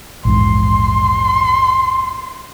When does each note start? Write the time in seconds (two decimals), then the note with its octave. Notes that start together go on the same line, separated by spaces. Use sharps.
0.25 A#1 E2 G#2 C6